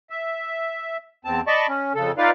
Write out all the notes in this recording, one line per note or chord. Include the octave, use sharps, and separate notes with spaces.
E5
E2 C4 A5
D5 D#5 A5 B5 C#6
C#4
F2 C#3 A4
D#4 F4 B4 D5 F5